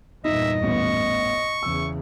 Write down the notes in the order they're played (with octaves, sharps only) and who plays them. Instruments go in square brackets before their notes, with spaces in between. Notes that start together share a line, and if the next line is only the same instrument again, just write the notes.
[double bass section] E2 G2 A#2 [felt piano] D#4 [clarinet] D#5 [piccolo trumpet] E5
[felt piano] A1 B3 [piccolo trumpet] C#6
[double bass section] E2 C#3 E3 [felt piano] E6